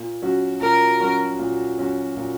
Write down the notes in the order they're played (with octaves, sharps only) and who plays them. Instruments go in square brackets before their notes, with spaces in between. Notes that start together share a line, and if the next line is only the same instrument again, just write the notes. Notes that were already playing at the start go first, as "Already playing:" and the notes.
Already playing: [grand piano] A#2
F#3 C#4 F#4
[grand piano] A#2 [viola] A#4
[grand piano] F#3 C#4 F#4
A#2
F#3 C#4 F#4
A#2